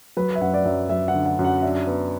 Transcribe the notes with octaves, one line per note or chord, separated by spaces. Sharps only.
F#3 B4
E5
F#2 F#5
D5
F#2 E5
F#3 E5
F#5
D3
F#5
F#2
F#5
D4 E5
B3